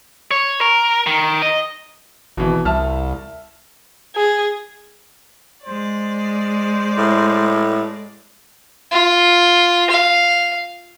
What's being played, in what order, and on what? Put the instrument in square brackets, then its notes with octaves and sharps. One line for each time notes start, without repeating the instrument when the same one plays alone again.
[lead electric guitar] C#5
A#4
D#3
D#5
[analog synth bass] G#1 [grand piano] B2 E3
[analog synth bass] C2 [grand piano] E5 A5 F6
[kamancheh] G#4
[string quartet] G#3 D5 [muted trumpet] C5
[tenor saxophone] A2
[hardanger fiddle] F4
F5